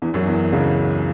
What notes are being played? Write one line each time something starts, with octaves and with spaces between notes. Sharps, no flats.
E2 E3
F#2 F#3
E2 E3
C#2 C#3